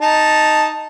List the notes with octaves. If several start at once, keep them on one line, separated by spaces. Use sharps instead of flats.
D#4 A5